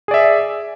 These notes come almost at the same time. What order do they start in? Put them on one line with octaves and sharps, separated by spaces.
G#4 D5 E5